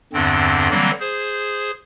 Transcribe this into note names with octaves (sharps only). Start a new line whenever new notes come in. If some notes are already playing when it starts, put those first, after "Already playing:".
E2 G2 D3 C4
D3 E3 F#3 G3 A#3 C4
G#4 C5